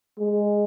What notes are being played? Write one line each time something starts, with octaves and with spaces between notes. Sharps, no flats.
G#3